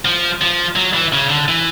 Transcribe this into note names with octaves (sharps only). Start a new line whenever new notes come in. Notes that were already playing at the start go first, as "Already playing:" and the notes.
F3
F3
F#3
E3
C#3
D3
E3